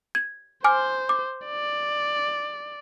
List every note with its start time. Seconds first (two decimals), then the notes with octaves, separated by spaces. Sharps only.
0.15 G#6
0.64 C5 G#5 D6 F6
1.09 D6
1.46 D5